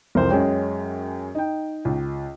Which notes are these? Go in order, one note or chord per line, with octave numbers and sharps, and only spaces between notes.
C2 F2 A#4 C5
F#2 G#3 C#4 C#5 G5
D#4 G5
C#2